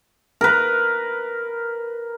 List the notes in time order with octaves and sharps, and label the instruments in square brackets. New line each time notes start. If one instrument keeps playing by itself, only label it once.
[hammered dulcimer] A#4 B4